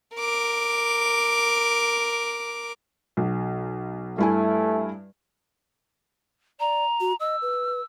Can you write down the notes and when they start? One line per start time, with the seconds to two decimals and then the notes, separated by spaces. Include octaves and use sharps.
0.16 A#4 D6
3.17 B1
4.18 G2 A3 E4 G#5
6.60 D5 A#5
7.00 F#4
7.20 D#5 E6
7.42 B4